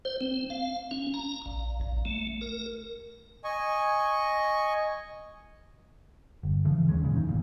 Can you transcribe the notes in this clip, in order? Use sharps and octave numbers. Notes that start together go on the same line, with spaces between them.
C5
C4
F5
C#4
A#5
A#1
A#1
A3
A#4
D#5 G#5 C#6
G1
C#3 E3 F3
D#2 G#3 B3 C#4
A#2 C#3 E3
F2 D#3
A#1 E2 A#2